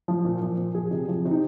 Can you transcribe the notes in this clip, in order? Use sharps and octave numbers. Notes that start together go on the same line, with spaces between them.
F3
A#2
F3
A#2
F3 G#4
C3
F3
C3
D#4